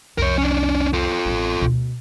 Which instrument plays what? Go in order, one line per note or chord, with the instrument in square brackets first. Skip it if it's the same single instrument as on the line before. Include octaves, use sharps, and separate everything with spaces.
[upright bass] C2 F2 [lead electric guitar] A#4 C#5
[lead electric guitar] C#4 D4
F4 A4
[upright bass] A1 G3
D2 B2